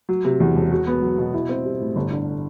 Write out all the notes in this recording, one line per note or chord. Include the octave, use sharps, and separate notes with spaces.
F#3
C3
E2
E1
F#4
B3
F#3
B2
E4
C4
G3
A2
G1
D3